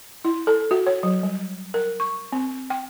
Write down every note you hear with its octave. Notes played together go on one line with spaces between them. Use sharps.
E4
A4
F#4
C#5
F#3
G3
A#4
C#6
C4
G5